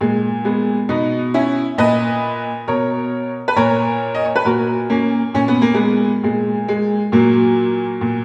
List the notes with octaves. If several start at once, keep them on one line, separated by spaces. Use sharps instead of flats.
A#2 G#3
G#3 B3
B2 B3 D#4
C#4 E4
A#2 B4 D#5
B2 A#4 C#5
B4
A#2 A#4 C#5
D#5
C#5
B4
A#2 F#4 A#4
A#3 C#4
A#2 C#4
B3
A#3
G#3 B3
A#2 G#3
G#3
A#2 F#3 A#3
A#2